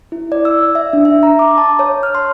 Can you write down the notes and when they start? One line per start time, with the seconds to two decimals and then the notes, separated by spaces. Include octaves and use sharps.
0.12 E4
0.32 D5
0.45 E6
0.75 E5
0.93 D4
1.05 E5
1.23 A#5
1.39 D6
1.58 A5
1.79 C#5
2.03 F6
2.15 C6